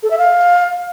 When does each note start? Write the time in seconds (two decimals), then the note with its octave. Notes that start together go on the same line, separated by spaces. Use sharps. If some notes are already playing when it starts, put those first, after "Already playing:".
0.03 A4
0.11 E5
0.18 F5